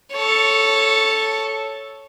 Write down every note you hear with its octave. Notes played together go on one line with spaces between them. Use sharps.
A4 C#5